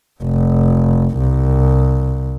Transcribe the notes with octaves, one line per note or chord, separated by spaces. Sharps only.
F1
C2